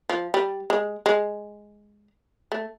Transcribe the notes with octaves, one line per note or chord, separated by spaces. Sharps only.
F3
G3
G#3
G#3
A3